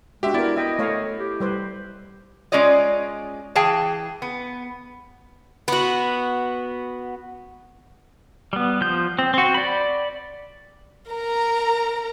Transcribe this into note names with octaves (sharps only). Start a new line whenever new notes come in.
G#3 D4 F#4 G4 E5
B3 E4 A#4 D5
D#5 E5 G5
A3 C#5 F5
G4
G3 B4 C5
G#3 C#4 F4 D5 D#5
E3 G#4 F5 G5 A5
B3
B3 F#4
G3 B3
F3 G6
C4
C4 F#4
D5 B5
A#4 A#5